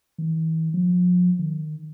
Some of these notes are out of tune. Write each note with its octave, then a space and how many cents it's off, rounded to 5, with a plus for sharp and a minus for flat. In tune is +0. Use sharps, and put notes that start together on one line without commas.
E3 -40
F3 +40
D#3 -20